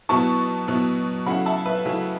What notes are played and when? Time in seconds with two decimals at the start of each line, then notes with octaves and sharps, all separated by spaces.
0.09 B2 F#3 B3 E4 A5 C#6
0.68 B2 F#3 B3 E4
1.26 C#3 F#3 A3 C#4 E4 F#5 B5
1.46 E5 A5
1.65 B4 E5
1.85 C#3 F#3 A3 C#4 E4